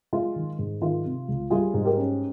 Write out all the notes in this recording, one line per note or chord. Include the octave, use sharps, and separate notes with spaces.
G#3 F4
D#3
G#2
D#3 F4
C3
C#2
G3 F4 G#4
G#2
G4 A#4
C#4